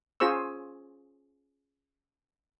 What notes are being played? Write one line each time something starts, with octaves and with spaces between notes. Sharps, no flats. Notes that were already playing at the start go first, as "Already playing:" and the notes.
C#4 F4 G#4 C5 C#6 E6